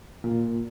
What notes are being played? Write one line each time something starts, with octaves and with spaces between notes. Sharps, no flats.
A#2